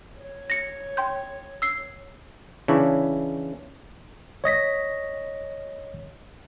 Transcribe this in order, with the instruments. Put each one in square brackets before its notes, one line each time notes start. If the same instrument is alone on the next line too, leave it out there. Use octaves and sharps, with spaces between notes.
[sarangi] C#5
[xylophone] A#6 C#7
G5 C6 G6
E6 C7
[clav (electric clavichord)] C#3 E3 D4 E4 C#5
[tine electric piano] C#5 D#5 A#6 B6